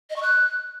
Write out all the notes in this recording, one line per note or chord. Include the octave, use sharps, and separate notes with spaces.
D#5
C#6
F#6